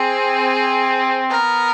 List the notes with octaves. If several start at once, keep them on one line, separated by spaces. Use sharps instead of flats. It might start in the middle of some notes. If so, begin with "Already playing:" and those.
Already playing: C4 G#4
B3 A#4